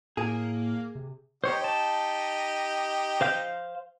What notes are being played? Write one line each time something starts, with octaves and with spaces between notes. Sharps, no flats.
A2 A#3 G#4
C3
D#4 G4 C5 C#5
A5
C5 F5 G6